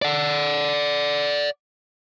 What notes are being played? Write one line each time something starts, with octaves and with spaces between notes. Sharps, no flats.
D5 F#5